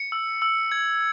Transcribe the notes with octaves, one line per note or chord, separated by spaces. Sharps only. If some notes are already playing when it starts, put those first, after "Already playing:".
Already playing: C#7
E6
E6
G#6